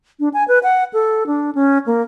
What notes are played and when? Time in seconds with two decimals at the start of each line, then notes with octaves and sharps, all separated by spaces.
0.20 D4
0.34 G#5
0.48 B4
0.63 F#5
0.93 A4
1.27 D4
1.55 C#4
1.86 A#3